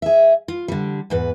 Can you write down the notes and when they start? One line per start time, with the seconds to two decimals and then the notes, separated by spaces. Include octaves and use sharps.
0.02 G#4 E5
0.48 F4
0.68 D3 G3
1.10 E2 G#2 B4